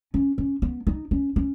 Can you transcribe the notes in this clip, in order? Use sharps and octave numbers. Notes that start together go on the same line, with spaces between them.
C#4
C#4
B3
D#4
C#4
C#4